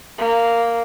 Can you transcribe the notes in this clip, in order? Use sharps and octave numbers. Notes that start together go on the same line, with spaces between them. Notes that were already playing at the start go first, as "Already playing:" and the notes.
A#3